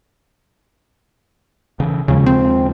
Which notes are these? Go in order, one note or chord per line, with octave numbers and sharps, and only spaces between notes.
C#3 E3
D#2 C#3 F3 G#3
C4